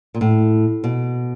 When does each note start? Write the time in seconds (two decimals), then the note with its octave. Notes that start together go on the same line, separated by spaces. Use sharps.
0.15 A#2
0.21 A2
0.84 B2